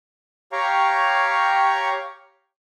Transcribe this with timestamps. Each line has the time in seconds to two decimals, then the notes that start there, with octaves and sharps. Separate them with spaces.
0.52 G4 C#5 F5 G5 A#5 C#6